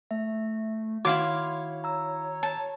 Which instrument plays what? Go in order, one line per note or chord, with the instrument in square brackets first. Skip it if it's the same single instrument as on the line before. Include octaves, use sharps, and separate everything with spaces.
[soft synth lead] A3 [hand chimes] E5
[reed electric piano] D#3 F#4 [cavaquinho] E4 F5 D6 [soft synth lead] C#5 [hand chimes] C6
[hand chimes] A#5 E6
[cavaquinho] A5